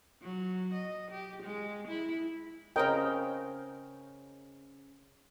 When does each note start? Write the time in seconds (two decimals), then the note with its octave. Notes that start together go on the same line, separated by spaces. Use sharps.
0.22 F#3
0.73 D#5
1.11 G4
1.42 G#3
1.87 E4
2.76 C#3 C4 C#4 A#4 D#5 G5